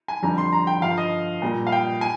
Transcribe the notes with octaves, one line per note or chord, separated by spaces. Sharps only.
G#5
F2 D3 G3 A#5
C6
A#5
G5
G2 D3 F3 F5
D#5
A#2 G3
F5
G5
G#5